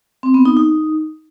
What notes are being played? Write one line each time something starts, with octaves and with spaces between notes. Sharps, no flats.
C4
B3
D#4
D#4